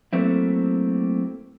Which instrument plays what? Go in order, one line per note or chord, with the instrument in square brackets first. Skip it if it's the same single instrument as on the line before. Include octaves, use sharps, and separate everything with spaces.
[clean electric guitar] F#3 A3 A#3 C4 E4